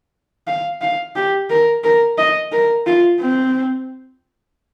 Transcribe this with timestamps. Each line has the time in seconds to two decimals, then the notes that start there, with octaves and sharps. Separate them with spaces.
0.47 F5
0.81 F5
1.16 G4
1.50 A#4
1.84 A#4
2.18 D#5
2.52 A#4
2.86 F4
3.21 C4